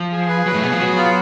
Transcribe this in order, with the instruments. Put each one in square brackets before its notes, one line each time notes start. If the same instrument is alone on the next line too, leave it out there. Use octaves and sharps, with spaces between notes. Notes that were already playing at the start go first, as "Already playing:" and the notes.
Already playing: [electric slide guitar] F3
[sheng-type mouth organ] G#4
B4
[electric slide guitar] F#3 [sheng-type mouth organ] B4
[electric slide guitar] A2 A3
[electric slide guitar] B2 B3 [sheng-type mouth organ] G#4
[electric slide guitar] F3 F4
[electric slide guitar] F#3 F#4 [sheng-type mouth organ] B3
[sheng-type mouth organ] F4